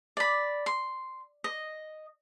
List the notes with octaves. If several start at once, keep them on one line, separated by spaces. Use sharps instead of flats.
D5 B5
C6
D#5